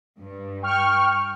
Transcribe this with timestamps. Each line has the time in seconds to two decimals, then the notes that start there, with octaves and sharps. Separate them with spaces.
0.17 G2
0.63 G5 C#6 F6